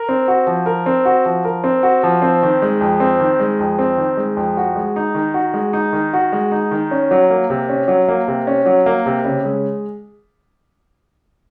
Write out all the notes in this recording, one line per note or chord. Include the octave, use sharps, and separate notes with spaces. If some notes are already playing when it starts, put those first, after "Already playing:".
Already playing: A#4
C4
F#4
F3
A#4
C4
F#4
F3
A#4
C4
F#4
F3
C4
D#3
G#3
F2
C4
D#3
G#3
F2
C4
D#3
G#3
F2
F#4
G#3
D#4
D#3
F#4
G#3
D#4
D#3
F#4
G#3
D#4
D#3
C#4
F#3
A#3
C3
C#4
F#3
A#3
C3
C#4
F#3
A#3
C3
C#3
G#3